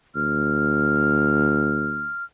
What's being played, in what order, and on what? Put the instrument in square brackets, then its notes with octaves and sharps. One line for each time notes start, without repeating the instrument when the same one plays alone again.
[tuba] D2 [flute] F6